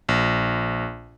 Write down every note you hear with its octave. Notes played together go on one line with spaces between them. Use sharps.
A#1